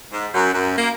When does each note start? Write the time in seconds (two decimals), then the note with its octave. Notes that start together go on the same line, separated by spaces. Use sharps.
0.11 G#2
0.34 F#2
0.53 F#2
0.77 A#3